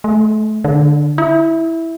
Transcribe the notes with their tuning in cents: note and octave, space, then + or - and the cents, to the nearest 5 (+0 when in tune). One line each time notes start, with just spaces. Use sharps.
A3 -30
D3 +15
E4 -5